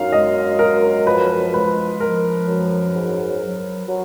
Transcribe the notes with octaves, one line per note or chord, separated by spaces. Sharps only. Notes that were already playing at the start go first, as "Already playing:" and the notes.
Already playing: F#2 D#4 F5
G#3 D#5
F#2 A#4
F3 B4
G#3 B4
F3 A#4
F#2
G#2
F#3
F#3